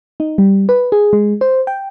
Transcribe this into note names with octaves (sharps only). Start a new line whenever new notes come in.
D#4
G3
B4
G#4
G#3
C5
G5